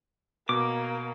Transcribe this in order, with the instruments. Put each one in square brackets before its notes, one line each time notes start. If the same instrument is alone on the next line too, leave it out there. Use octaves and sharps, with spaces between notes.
[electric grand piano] B2 [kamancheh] A#3 [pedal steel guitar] D6